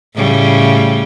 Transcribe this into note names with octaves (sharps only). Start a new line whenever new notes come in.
A2 C#3 G3